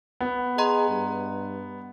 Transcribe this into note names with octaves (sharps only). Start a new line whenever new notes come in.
B3
G#4 D#5 A#5 C6
G2